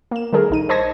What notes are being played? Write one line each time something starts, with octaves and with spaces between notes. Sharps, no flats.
A#3 E7
D#3 G3 A3 G#4 A#4
A#1 D#4 D#7
C5 D#5 A5 C#6 G#6 A#6